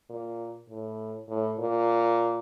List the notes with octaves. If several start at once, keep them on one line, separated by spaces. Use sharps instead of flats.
A#2
A2
A2
A#2